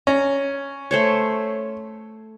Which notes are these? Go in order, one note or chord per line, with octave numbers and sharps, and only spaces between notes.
C#4 A#5
A3 C5 C#5